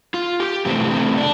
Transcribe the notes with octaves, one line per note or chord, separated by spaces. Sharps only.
F4
G4
C3 E3 A3 C4 G4
C4
D4